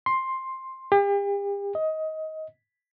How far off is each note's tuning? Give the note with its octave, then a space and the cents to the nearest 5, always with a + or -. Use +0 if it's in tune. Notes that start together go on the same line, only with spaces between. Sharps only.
C6 +10
G4 +40
D#5 +20